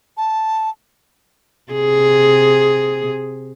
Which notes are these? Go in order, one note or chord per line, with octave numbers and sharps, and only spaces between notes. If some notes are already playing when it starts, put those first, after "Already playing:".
A5
C3 G#4